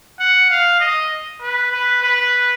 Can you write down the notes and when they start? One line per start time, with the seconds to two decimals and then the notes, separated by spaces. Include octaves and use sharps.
0.20 F#5
0.50 F5
0.80 D#5
1.42 B4
1.72 B4
2.03 B4